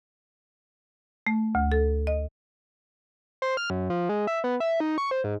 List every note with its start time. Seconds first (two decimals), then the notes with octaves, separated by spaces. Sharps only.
1.27 A3
1.55 D2
1.72 A4
2.07 D#5
3.42 C5
3.57 F6
3.70 F#2
3.90 F3
4.09 G#3
4.27 E5
4.44 B3
4.60 E5
4.80 D#4
4.98 C#6
5.11 C5
5.24 G#2